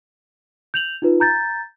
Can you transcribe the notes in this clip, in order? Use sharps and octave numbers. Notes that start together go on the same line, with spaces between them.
G6 F7 F#7
D#4 F4 B4
A#5 G6 A6